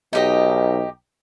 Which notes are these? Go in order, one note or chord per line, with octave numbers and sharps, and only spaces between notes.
B1 D#4 G4 D#5